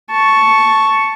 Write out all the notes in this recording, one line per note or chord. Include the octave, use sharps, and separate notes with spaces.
A5 C#6